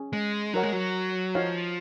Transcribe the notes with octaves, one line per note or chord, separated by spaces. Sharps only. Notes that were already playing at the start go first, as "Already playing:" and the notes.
Already playing: C#4 G#4
G#3
F#3 D#4 A#4 C#5 F#5
G#3
F#3
F3 D#4 F#4 C#5 F5